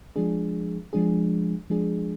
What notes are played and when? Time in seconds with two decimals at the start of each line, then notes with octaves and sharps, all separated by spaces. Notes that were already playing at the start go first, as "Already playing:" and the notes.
0.16 F3 G#3 D4 G#4
0.93 F3 G#3 D4 G#4
1.70 F3 G#3 D4 G#4